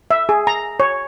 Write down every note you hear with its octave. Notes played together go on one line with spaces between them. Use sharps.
E5
G#4
A#5
C#5